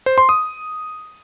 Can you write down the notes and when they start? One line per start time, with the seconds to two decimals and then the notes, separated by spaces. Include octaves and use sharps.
0.06 C5
0.18 C6
0.29 D#6